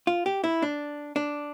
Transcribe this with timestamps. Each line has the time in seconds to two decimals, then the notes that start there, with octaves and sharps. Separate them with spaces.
0.07 F4
0.26 G4
0.44 E4
0.62 D4
1.16 D4